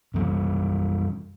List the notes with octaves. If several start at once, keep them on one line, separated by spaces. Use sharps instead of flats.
F#2 E3 G3